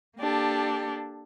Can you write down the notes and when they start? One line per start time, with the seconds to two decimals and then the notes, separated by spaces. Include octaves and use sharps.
0.17 A#3 D4 G4 A4